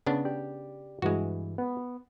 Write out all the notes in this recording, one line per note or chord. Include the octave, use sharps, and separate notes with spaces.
C#3 B3 D4
G4 D5
G2 E3 G#3 F#4
B3